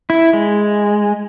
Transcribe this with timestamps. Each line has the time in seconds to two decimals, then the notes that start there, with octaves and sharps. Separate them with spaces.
0.10 E4
0.33 G#3